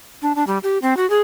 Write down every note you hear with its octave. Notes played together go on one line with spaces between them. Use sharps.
D4
D4
G3
G4
C4
F#4
G#4